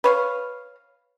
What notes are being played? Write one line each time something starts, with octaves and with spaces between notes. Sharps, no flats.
B4 C#5 F5